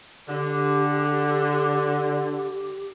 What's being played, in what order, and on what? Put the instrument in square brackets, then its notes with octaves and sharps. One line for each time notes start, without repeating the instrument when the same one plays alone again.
[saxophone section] D3 [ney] G4